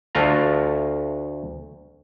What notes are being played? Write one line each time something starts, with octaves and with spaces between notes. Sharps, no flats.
D2 A3 F4 A#5